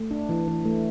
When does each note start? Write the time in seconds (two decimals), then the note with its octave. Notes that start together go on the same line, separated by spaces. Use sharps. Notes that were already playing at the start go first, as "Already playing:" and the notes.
Already playing: A3
0.11 D4
0.29 E3
0.48 E3
0.65 A3